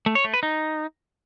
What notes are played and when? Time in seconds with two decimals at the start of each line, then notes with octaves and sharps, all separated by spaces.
0.06 A3
0.15 C#5
0.24 A3
0.34 B4
0.43 D#4